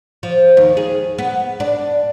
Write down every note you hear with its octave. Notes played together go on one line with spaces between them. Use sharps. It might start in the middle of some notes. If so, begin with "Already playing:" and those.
F3
D#2
G#4
B3
D4